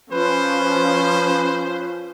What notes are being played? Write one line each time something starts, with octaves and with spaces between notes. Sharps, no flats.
F3 C#4 B4 C5